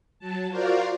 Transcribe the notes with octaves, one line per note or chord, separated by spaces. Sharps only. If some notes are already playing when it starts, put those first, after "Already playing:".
F#3 A5
F4 F#4 A#4 C5 D5 F5